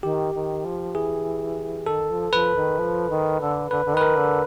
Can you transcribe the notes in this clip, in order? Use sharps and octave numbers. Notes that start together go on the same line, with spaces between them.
D#3 G4
D#3
F3
E3 G#4
D#3 A4
F3
F3 B4
D#3
F3
D#3
D3
D3 B4
D3
D#3 B4
A#4
D3